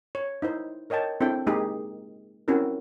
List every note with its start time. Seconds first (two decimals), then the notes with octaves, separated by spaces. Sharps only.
0.15 C#5
0.42 D#4 E4 C5
0.90 A#4 C#5 D#5 G5 A5
1.21 C4 D4 E4 A4 E5 G5
1.47 G#3 A#3 D#4 G4 G#4
2.48 C4 C#4 E4 F#4 G4 A#4